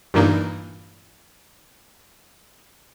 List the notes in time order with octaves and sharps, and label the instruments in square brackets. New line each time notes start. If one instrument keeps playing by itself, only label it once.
[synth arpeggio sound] G2 A#2 E3 A#3 D4 D#4